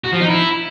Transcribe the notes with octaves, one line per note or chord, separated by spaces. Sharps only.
F#4
F3
D#4
E4